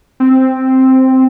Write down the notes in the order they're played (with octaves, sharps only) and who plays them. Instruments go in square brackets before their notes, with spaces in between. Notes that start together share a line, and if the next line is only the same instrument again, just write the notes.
[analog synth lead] C4